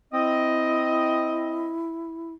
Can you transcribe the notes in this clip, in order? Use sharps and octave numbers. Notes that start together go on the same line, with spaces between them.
C4 E4 D#5